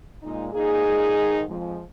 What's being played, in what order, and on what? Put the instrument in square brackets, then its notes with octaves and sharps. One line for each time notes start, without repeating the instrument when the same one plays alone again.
[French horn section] A#2 G#3 D#4
A#2 A#3 D#4 G#4
A#2 G#3
G#2 D#3 G#3
F2 F3 G#3